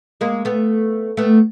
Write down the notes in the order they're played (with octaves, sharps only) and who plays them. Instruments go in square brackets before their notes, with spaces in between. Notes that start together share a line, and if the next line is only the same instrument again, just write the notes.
[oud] G#3 A#3
A3 B3
A3 B3